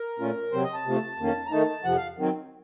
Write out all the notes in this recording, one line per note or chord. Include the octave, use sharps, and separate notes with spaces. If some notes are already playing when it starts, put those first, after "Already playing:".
Already playing: A#4
A#2 A3 C#4 F4
C3 F#3 C4 C5
D#5
A5
C3 F3 A3
F2 D#3 A#3 C#4
A#5
D#3 A3 D#4 A5
F2 C3 F3 F#5
F5
D#3 F#3 C4